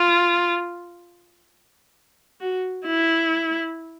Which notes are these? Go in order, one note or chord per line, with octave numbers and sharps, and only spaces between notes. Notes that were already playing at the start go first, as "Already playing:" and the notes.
Already playing: F4
F#4
E4